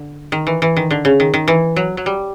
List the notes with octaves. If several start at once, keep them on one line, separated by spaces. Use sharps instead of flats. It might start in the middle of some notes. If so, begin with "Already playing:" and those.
Already playing: D3
D#3
E3
E3
D#3
D3
C#3
D#3
D#3
E3
F#3
F#3
G3